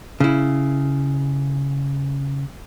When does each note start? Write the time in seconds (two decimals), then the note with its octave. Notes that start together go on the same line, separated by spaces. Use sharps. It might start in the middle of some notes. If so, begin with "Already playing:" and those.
0.20 C#3 E4